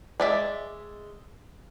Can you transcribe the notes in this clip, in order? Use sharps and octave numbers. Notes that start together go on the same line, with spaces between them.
G#3 D5 E5